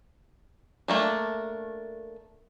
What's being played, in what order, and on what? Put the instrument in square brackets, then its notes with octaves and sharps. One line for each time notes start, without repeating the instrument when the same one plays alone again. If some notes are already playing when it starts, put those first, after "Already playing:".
[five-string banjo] A3 A#3 D4